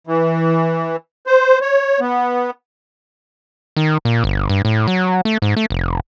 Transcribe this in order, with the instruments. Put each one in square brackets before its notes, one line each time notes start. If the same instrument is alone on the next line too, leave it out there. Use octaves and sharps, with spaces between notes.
[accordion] E3
C5
C#5
B3
[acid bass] D#3
A#2
G1
G2
A2
F#3
A3
G#2
A3
F1